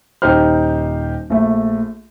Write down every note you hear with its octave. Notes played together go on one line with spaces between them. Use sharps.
D#1 D#4 G4 C5 F6
A#1 A3